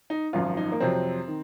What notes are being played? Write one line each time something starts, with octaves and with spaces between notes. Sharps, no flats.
D#4
G#1 F#2 F3 F4
D#4
A#3
F2 C3 F#3 C4
D#3